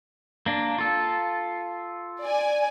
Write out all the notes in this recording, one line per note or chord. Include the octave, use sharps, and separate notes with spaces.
A#3 D4
F4 A4
D5 G#5